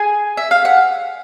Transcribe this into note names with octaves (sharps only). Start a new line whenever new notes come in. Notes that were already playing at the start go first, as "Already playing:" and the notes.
Already playing: G#4 G#5
E5
F5
F#5